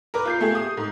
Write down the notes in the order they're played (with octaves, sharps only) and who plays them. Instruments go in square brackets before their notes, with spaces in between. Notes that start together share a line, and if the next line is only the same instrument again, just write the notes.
[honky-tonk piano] A#4 B4 D6
F4 G6 C7
A3 G4 G#4
D#6
G#2